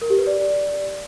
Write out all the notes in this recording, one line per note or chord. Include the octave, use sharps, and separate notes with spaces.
A#4
G4
B4
D5